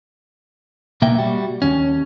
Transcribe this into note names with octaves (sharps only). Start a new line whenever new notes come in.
B1 B2 A#3 B3 E5 G5
G3 F#4
D#2 C#4